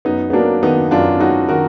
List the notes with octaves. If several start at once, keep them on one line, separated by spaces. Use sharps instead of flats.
F#2 B3 D#4
B3
F#3 A#3 D4
D#3 B3 D#4
F#2 D4 F4
F#3 D#4 F#4
D#3 F#4 A#4